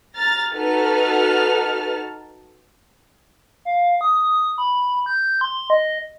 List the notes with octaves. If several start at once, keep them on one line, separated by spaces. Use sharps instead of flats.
A#5 F6 A6
D#4 F#4 A4 B4 A5 F6
F5
D#6
B5
G6
C6
D#5